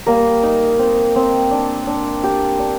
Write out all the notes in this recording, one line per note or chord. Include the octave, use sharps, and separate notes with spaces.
G3 A#3 A#4
D#4
C4
C4
D4
D4
D4 G4
D4